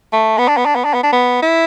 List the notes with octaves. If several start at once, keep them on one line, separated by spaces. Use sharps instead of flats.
A3
B3
D4
B3
D4
B3
D4
B3
D4
B3
E4